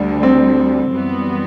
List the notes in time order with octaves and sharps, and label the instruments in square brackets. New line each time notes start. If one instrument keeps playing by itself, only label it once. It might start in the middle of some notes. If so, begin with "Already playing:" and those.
Already playing: [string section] D2 D3 G3
[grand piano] C4
[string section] F#2 E3 G3 B3